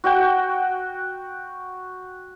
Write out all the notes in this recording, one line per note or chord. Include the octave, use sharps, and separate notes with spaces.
F#4 F#5 G5